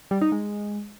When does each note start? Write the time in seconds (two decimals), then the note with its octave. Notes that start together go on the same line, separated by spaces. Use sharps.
0.11 G3
0.21 D#4
0.32 G#3